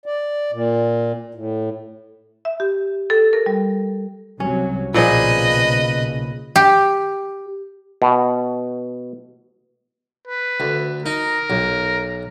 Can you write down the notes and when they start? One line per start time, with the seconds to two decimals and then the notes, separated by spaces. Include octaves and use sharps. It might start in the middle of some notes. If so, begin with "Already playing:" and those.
0.06 D5
0.52 A#2
1.35 A2
2.45 E5
2.60 G4
3.10 A4
3.33 A#4
3.46 G3
4.40 C2 C3 F#3 C#4
4.94 B1 A#2 C#3 F3 G#4 B4 D#5
6.56 G4
8.02 B2
10.28 B4
10.60 D2
11.06 D#4 A#4
11.50 B1